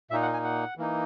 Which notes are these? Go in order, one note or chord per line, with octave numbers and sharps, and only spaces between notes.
A#2 A#3 D#4 E5
F#5
G#5
F#5
E3 A#3 D#4